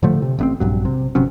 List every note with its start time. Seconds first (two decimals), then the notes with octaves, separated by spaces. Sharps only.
0.03 A2 D3 F3 A3
0.22 C3
0.39 A1 B3 C4
0.60 A#1 G2 F#3
0.85 C3
1.15 G1 C3 F#3 C#4